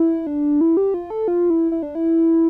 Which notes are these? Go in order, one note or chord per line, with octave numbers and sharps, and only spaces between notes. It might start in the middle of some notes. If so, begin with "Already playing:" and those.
Already playing: E4
D4
E4
G4
F4
A4
F4
E4
E4
D4
E4